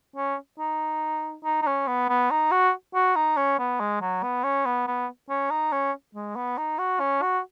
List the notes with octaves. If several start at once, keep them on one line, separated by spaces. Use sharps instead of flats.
C#4
D#4
D#4
D#4
C#4
B3
B3
D#4
F#4
F#4
D#4
C#4
B3
G#3
F#3
B3
C#4
B3
B3
C#4
D#4
C#4
G#3
B3
D#4
F#4
C#4
F#4